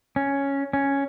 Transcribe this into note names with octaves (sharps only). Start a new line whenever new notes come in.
C#4
C#4